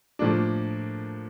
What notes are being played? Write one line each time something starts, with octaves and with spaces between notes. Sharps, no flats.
A2 F3 A#3 D4